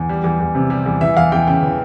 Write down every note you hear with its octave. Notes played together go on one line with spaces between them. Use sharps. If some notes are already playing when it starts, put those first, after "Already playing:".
Already playing: E2
G3
E2
E2
C3
G3
E2
E3 E5
E2 F5
E2 G5
C#3 G5
E3